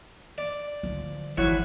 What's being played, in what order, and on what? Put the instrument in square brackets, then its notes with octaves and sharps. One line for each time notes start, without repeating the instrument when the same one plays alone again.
[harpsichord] D5
[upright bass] D3 F3
[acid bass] G#1 [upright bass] D3 [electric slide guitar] E3 [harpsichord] F#4 C#5